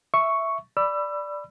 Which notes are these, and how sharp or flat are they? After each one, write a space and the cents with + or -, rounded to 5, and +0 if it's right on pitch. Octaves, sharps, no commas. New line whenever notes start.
E5 +0 C#6 +0
D5 +0 B5 +0 E6 +30